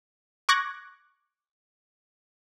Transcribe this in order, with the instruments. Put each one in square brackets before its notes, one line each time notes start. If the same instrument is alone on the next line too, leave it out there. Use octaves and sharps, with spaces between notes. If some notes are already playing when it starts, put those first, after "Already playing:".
[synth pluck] C#6 D6 F#6 G#6 A#6